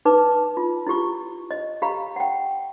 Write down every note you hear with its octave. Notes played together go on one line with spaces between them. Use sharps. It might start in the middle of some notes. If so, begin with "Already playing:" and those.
D#4 B4 A5 D6
F4
E4 F4 G4 C#6
D#5
G4 F5 A#5 B5
F#5 G5